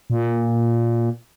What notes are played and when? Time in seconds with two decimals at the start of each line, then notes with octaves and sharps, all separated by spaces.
0.10 A#2